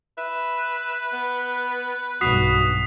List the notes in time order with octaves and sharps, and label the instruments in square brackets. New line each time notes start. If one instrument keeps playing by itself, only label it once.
[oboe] B4 [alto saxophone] E5
[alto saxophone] B3
[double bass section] B1 G2 [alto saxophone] F#4 [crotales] D#6 B6 C7